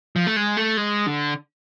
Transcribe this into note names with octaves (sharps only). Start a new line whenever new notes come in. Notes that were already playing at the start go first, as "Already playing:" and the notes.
F3
A3
G#3
A3
G#3
D3